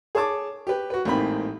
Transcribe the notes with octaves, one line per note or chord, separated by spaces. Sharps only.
G#4 C#5 A5 D6
G4 B4
F#4 B4
A1 G#2 A#3 C4 B5